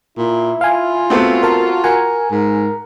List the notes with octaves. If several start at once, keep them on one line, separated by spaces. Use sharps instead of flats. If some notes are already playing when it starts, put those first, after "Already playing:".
A#2 E4
F4 F5 G#5
A3 B3 C4 F#4
A#4 F5 A5
F#4 A#4 G#5
G#2 A#4